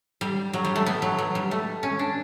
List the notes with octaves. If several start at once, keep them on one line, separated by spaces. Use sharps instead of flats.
G3
F#3
G3
A3
B3
F#3
F#3
G3
A3
C#4
D4